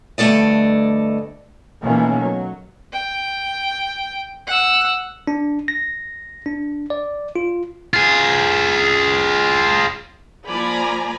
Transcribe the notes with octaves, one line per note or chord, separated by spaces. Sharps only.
D2 G2 A3 A4 D5 D#5
B2 D#3 E3 A3 A#3 C#4
F#3
G5
F#5 E6
D4
A#6
D4
D5
F4
F4 G#4
F3 A#3 D5 G#5 A#5 B5